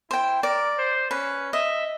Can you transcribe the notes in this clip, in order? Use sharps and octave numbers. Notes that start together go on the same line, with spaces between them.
E4 C5 G5
A#4 D5
C5
C#4 B4
D#5 E5